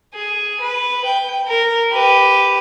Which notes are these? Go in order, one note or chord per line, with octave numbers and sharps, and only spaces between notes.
G#4
B4
G5
A#4
G4 B4